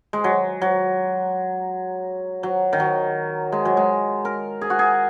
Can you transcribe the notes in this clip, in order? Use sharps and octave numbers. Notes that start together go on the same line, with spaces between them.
G#3
F#3
F#3
F#3
D#3
F#3
G#3
F#3
G#3
A#4
G#4
F#4
G#4